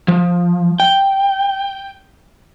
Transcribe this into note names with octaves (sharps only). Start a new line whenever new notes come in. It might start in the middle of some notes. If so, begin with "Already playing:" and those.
F3
G5